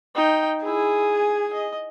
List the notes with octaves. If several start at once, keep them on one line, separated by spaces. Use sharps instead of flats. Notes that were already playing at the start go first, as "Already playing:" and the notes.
D#4 G5
E4 G#4
G#5
D#5